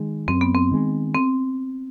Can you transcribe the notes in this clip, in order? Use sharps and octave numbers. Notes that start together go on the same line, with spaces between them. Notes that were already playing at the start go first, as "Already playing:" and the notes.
Already playing: D#3 G#3
F#2 C4
B3
C4
D#3 G#3
C4